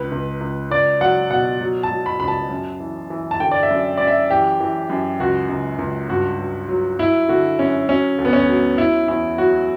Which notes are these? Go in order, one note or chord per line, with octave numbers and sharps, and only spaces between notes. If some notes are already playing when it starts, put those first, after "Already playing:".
Already playing: C#2 B4
C#2
C#2
C#2 D5
F#3 F#5
B2 F#5
F#3
A5
F#3
B5
C#2 B5
A5
F#2
E3
E3
A5
D3 G5
D5
E5
F#2
F#2 D5
E5
E3 G4
E3
F#2
C#2 F#4
C#2
C#2
G2 F#4
F#3
F#3
F#3 E4
D3 F#4
F#2 C#4
F#3 C#4
D2
B3
C#4
F#3
F#3 E4
E2 E4
F#3 F#4